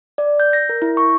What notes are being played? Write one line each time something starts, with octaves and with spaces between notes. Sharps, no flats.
D5
G6
A#6
A#4
E4
C#6